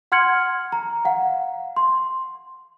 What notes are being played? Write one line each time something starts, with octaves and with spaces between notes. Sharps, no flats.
F#5 C6 F6 G#6 C#7 F#7
A#5
F5 F#5
C6